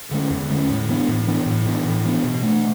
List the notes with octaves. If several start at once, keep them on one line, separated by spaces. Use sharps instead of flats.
D3 G#3 C#4
E2
D3 G#3 C#4
A2
E3 B3 D4
A2
E3 B3 D4
A2
E3 B3 D4
A2
E3 B3 D4
B2
A3 D4